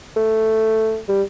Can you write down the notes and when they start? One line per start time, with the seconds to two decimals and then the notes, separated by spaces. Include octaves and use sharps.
0.17 A3
1.08 G3